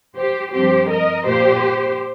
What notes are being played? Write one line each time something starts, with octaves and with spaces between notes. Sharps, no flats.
G4 C5
G2 F3 C4 G4 C5
A#4 D#5
A#2 A#3 G4 C5